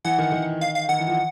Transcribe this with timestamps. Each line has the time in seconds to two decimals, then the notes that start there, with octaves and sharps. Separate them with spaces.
0.05 E3 F#5
0.18 D#3
0.32 D#3
0.61 F5
0.75 F5
0.89 D#3 F#5
0.99 E3
1.07 F3